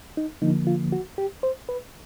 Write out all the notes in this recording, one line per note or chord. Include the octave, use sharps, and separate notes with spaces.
D#4
D3 F3 A#3 D#4
F4
F#4
G4
C5
B4